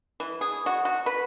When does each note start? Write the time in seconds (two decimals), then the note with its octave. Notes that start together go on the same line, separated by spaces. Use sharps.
0.20 E3
0.41 G#4
0.66 F#4
0.85 F#4
1.06 B4